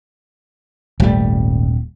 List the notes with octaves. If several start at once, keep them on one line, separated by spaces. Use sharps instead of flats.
D#1 G#1 G3 A3